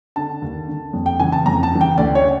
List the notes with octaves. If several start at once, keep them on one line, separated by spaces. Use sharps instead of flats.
D3 A5
D#2
D3
F2
G5
C#3 E3 G#5
A5
F2 A#5
A5
C#3 E3
G5
D2 D5
C#5
C#3